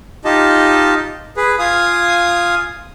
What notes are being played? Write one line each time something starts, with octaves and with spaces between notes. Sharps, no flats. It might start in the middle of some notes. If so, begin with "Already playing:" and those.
D#4 F4 G4 D#5 A5
G#4 B4
F4 F5 G#5 D#6